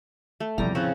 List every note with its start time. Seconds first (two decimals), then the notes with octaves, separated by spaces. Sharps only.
0.40 A3
0.58 E2 C3 D#3 F3 G3 A#5
0.75 A2 C#3 C4 C#6 F#6